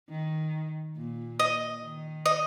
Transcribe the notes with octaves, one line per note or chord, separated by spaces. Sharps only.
D#3
A#2
D#5
D#3
D#5